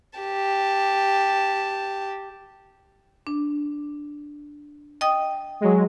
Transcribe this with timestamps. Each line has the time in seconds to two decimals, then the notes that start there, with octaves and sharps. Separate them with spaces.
0.19 G4 A5
3.27 D4
5.01 D#5 G5 D#6
5.61 F#3 G#3